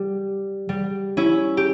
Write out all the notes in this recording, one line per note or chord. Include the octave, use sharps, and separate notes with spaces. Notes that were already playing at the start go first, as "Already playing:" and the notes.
Already playing: G3
G3
C#4 E4
G4